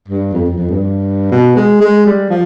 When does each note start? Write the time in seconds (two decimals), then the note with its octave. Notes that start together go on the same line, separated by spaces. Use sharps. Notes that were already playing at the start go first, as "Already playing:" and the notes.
0.08 G2
0.33 F2
0.45 F2
0.58 F2
0.70 G2
1.32 B2
1.56 G#3
1.81 G#3
2.06 G3
2.30 F3